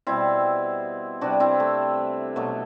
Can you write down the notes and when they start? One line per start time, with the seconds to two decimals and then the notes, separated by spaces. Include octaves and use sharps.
0.07 B2 G3 C4 E4
1.21 C3 G3 D4 F#4
1.40 C4 E4
1.60 A3
2.36 B2 F#3 A3